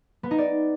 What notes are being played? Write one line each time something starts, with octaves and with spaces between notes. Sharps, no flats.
B3
D#4
D5